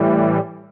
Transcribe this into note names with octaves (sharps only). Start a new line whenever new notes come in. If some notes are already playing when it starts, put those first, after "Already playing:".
Already playing: A2 E3 G3